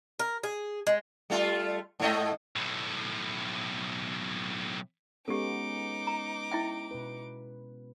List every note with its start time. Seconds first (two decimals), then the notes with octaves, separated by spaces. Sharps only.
0.19 A#4
0.43 G#4
0.87 G#3
1.30 G3 A3 F4
2.00 G#2 A3 D#5
2.56 B1 A2
5.28 G#3 B3 C#4 D#4 G4 A4 D6
6.07 A#5
6.51 E4 E5 G5
6.91 B2 B4